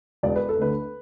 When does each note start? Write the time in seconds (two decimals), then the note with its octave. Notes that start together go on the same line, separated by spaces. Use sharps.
0.23 E1 D5
0.36 B4
0.49 A4
0.57 D2 D3 B4